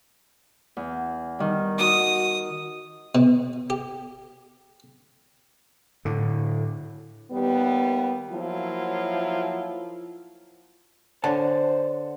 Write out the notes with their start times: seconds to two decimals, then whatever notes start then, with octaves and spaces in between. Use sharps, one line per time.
0.77 E2
1.39 D#3 G3
1.78 D#4 F#4 D#6
3.15 B2
3.70 G4
6.05 A2 D3
7.31 D#2 G3 B3
8.31 F3 F#3 A#3 E4 F4
11.24 D3 C5 C#5 F#5 A5